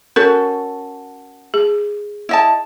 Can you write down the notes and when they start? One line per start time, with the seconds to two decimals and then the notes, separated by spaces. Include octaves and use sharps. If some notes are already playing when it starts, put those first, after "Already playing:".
0.16 C#4 F#4 A4 A#4
1.54 G#4
2.29 E4 D#5 A5